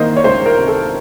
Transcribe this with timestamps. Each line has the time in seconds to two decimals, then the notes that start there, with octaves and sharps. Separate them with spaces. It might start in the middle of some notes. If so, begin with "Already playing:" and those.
Already playing: D#3 A#3 C5 D#5
0.17 C#5
0.24 C#2 C5
0.46 A#4
0.57 C3
0.67 A4